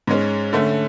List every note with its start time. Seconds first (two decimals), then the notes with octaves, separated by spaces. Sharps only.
0.07 G#2 G#3 C#4
0.53 D3 A3 C#4